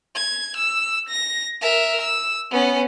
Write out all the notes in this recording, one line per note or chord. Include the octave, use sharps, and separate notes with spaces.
G#6
E6
A#6
A#4 E5
E6
B3 C#4